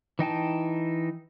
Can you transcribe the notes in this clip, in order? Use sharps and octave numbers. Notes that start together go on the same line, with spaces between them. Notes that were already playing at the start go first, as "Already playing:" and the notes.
E3 D#4 G5 A5